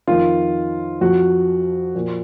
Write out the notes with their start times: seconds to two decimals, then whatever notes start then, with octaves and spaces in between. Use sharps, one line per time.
0.07 F2 D#3 F4
1.01 F2 F3 F#4
1.95 A#2 F3